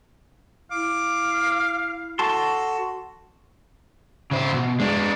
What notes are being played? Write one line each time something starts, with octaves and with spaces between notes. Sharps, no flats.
E4 F5 D6
F#4 A4 A5 C6
C#3 C5
B2
G#3 D4